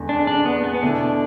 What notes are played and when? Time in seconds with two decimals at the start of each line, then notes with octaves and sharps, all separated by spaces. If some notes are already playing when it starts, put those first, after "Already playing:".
Already playing: E1 E2 D3
0.09 D4
0.27 D4
0.45 B3
0.64 B3
0.74 B3
0.82 B2 A3 D4 E4